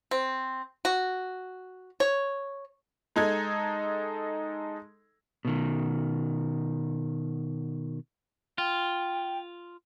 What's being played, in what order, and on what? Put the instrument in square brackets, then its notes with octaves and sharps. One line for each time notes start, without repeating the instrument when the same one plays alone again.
[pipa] C4
F#4
C#5
[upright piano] G#3 D#4 A4 G#6
[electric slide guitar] B2 D#3
[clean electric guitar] F4 [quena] G5